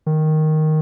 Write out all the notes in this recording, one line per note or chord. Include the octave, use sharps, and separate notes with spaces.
D#3